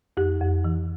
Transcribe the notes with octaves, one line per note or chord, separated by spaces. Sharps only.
F2 G4
F2
E3